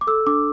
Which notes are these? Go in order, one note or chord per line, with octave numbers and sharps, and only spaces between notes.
D6
A4 E6
D4 D6